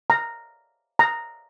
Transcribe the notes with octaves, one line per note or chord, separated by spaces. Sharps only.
A#5
A#5